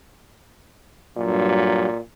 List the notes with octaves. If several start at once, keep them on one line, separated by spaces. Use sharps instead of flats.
G2 A#2 F#3